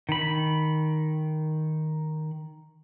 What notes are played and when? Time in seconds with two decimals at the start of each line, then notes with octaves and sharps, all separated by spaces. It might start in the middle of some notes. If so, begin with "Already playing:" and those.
0.09 D#3 B5